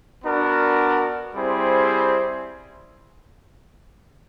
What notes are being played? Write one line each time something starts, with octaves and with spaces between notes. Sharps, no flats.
B3 D4 F#4 A#4
G3 C4 E4 G#4 C5